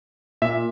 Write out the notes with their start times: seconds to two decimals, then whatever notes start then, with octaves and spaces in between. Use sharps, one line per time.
0.42 A#2 E5